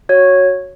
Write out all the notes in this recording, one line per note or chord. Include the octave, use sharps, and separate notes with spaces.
F#4 C#5